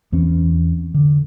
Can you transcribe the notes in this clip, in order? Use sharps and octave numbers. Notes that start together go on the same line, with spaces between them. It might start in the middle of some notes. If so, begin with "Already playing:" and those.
E2 E3 C4 C#4
D3